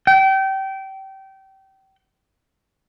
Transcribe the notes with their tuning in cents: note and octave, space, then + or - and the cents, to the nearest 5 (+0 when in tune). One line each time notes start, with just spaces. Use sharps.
G5 -25